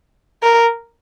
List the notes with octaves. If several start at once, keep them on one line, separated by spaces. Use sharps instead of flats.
A#4